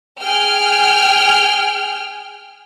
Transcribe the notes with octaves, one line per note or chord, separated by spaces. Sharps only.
G#4 G5 F6